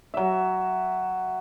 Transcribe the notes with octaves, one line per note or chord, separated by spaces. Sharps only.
F#3 E5